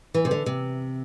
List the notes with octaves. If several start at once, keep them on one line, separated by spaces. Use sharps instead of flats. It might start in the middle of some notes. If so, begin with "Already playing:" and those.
E3
C3
D3
C3